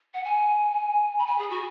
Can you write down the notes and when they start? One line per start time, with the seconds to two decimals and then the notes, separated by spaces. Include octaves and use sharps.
0.14 F#5
0.24 G#5
1.18 B5
1.26 G#5
1.38 G#4
1.49 F#4